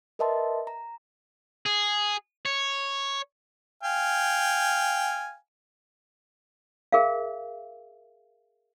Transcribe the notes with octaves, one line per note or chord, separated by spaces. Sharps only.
A#4 B4 D#5 E5 A5 C6
A#5
G#4
C#5
F5 G5 G#5
G#4 A#4 E5 F5